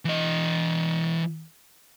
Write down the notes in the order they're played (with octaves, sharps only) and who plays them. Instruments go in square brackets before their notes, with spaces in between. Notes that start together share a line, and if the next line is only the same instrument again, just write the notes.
[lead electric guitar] E3 D#5